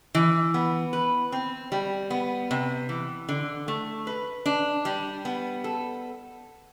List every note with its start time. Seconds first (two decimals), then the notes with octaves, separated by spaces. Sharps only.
0.15 E3
0.54 B3
0.93 B4
1.32 C4
1.72 G3
2.10 B3
2.51 C3
2.89 E3
3.29 D3
3.68 A3
4.07 B4
4.46 D4
4.85 G3
5.25 B3
5.64 A4